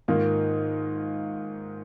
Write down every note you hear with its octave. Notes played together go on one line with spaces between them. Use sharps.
G#2 D#3 A#3 F4